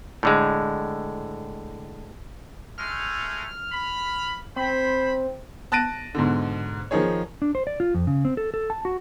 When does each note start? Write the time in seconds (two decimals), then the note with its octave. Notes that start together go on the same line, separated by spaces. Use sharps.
0.23 A2 D3 G#3
2.78 G#3 A3 F6
3.72 B5
4.56 C4 C5 B5
5.72 A5 F#6 A6 A#6 D7 D#7
6.15 G#2 B2 D3
6.91 D#3 F3 D#4 G#4 C#5
7.42 D4
7.55 C5
7.67 D5
7.80 F4
7.95 F2
8.07 C#3
8.25 C4
8.37 A4
8.54 A4
8.70 A5
8.85 F#4